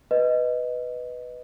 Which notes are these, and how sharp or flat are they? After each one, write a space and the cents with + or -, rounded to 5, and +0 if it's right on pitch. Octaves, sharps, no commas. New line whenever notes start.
B4 +0 D#5 +0